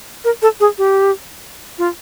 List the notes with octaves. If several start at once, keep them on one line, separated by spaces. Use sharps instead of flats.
A#4
A4
G#4
G4
F4